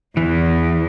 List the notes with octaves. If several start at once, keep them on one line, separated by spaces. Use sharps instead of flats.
E2 E3